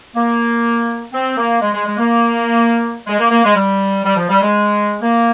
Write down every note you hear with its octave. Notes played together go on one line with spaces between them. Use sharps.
A#3
C4
A#3
G#3
G#3
G#3
A#3
G#3
A#3
A#3
G#3
G3
G3
F3
G3
G#3
A#3